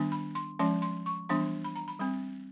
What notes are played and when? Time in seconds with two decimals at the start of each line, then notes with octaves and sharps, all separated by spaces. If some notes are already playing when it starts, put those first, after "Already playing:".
Already playing: D#3 G3 B3 D4
0.12 B5
0.35 C6
0.59 F3 G#3 C#4 C6
0.82 C6
1.06 C#6
1.29 E3 G3 B3 D4 C6
1.64 B5
1.76 A#5
1.88 B5
2.00 G3 C4 B5